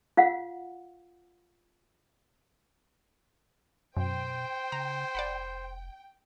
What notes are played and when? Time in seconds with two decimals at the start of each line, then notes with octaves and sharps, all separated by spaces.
0.17 F4 F5 F#5
3.97 F#2 B2 C5 G5
4.72 C#3 A#5
5.15 F1 D5 F#5 B5